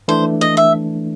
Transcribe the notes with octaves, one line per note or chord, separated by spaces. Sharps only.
E3 A3 D4 C5
D#5
E5